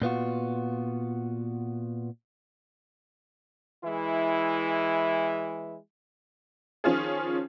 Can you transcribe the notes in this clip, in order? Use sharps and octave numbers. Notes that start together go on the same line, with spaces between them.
A#2 B3 F4 F#4
E3 G#3 E4
D#3 F3 C#4 F4 G#4